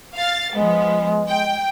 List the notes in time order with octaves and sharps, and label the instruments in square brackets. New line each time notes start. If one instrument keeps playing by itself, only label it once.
[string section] F5 A6
[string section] F3 B3 [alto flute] G#3
[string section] G5